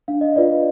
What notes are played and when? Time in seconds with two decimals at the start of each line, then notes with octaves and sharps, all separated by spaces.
0.08 D4 F5
0.21 D#5
0.33 F4 B4 D5 F5